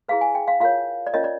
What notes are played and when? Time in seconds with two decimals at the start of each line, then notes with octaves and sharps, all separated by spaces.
0.09 E4 G#4 B4 F5
0.21 G#5
0.35 G5
0.48 F5
0.60 F4 A#4 C#5 F5
1.07 D5
1.14 C#4 F4 A#4 C#5 D#5
1.24 D5